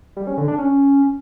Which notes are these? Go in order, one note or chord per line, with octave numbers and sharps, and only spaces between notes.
G3
C#4
D3
D4
C#4